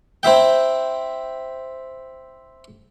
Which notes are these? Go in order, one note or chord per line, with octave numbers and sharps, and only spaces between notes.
C4 E4 E5 G5